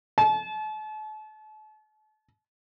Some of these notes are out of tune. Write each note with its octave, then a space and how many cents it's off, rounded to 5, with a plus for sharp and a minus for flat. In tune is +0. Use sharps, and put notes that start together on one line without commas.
A5 -40